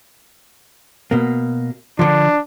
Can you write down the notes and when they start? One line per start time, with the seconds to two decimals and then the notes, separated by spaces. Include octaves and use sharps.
1.11 B2 A#3
1.99 D3 F3 D4